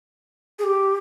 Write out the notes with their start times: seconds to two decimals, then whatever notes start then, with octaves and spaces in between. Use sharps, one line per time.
0.59 G#4
0.64 G4